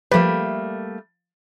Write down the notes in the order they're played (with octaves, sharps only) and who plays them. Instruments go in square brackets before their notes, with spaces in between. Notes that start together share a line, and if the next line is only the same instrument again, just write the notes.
[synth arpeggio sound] F3 B4 [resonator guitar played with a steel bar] G3 A3 A#3